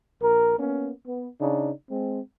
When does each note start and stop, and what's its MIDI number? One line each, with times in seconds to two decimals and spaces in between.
0.21 0.57 34
0.21 0.57 70
0.58 0.90 58
0.58 0.90 59
0.58 0.90 61
1.06 1.29 59
1.40 1.71 49
1.40 1.71 62
1.40 1.71 63
1.90 2.19 56
1.90 2.19 60